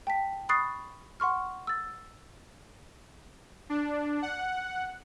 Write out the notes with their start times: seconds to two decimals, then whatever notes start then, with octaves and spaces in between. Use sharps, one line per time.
0.07 G5 A5 B6
0.49 B5 C#6 D#6 F#6 A6 C7
1.20 F#5 C6 C#6 F6
1.67 E6 A6
3.70 D4
4.22 F#5